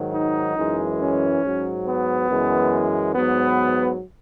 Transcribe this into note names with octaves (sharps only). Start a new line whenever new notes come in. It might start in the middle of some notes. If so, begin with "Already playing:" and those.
Already playing: G#2 D#3 F#3
D#4
F#2 E3 G#3
C#4
G#2 F#3
B3
F#2 E3 G#3
G#2 F#3 B3